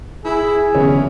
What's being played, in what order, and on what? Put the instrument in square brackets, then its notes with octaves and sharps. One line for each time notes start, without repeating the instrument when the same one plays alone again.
[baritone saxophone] E4 [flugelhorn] G#4
[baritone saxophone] E2 [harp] D3 E3 F#3 [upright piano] C#4